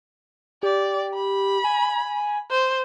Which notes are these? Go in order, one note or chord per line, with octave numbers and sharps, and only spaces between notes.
G4 D5
B5
G#5
C5